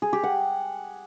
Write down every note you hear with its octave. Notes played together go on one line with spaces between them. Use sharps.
G#4
G4
F#5